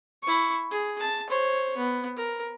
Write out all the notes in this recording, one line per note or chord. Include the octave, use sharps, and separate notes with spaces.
E4 C#6
G#4
A5
C5 C#5
B3
A#4